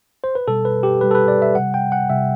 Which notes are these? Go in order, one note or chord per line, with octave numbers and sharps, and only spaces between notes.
C5
B4
B2 G3 A4
B4
G4
B2 G3 B4
A4
B4
D5
E5
C3 G3 F#5
G5
F#5
C3 G3 E5